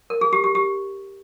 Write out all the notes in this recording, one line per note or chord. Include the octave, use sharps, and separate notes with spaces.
A#4
G#4
G4
G4
G4